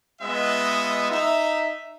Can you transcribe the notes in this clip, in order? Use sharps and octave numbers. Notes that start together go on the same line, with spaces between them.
G#3 B3 F4 D#5 E5
D#4 E5